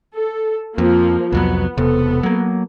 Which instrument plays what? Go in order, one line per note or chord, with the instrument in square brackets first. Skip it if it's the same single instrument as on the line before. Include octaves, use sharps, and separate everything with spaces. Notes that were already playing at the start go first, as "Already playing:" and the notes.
[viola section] A4
[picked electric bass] F2 [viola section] F3 A#3
[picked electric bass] C2 F2 F#3 [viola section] B3
[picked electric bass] E1 C3 [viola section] B3 A4
[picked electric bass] F#3 A#3